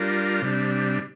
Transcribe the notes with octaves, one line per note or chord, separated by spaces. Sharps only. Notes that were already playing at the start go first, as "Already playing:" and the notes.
Already playing: G3 D4 F4 A#4
C3 G3 D4